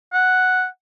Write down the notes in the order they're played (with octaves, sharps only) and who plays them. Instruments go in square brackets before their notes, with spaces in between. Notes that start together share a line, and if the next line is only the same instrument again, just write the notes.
[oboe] F#5